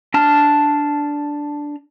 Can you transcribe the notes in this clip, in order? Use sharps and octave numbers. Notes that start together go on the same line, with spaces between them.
D4 A5 F6